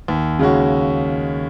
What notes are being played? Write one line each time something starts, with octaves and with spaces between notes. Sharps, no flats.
D#2
C#3 G#3 C#4 F#4